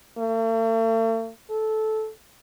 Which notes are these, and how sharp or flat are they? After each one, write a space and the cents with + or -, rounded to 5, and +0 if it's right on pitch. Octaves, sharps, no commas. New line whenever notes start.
A3 +45
A4 -15